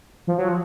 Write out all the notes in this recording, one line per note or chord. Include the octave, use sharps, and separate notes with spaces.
F3
F#3
F3